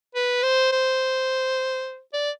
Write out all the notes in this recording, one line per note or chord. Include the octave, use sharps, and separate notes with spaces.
B4
C5
C5
D5